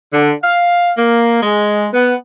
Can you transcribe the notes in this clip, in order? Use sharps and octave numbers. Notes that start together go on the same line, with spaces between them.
D3
F5
A#3
G#3
B3